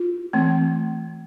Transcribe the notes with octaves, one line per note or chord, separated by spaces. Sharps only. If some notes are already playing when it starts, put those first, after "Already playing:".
Already playing: F4
E3 A3 C4